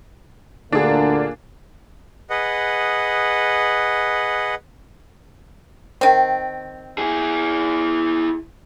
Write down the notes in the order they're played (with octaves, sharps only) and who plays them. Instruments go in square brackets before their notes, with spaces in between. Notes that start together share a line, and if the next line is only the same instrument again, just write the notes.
[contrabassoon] D2 [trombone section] A#2 A#3 [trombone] D3 [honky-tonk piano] D4 G#4
[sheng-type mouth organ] G#4 B4 D#5 F#5
[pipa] D#3 C4
[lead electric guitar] E4 G#4